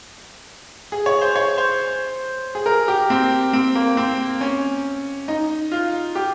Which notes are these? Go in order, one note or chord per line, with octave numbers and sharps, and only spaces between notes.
G#4
C#5
C5
C#5
C5
G#4
A#4
G4
C4
C4
A#3
C4
C#4
D#4
F4
G4